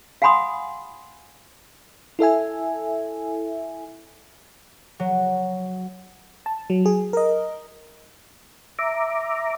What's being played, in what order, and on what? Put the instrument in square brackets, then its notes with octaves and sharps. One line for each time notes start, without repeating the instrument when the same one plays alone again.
[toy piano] F5 F#5 G#5 B5 C6 D#6
[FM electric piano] E4 A4 E5 G#5
[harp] F#3
[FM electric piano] A5
F#3
G#4
A#4 D#5
[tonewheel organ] E5 A#5 D6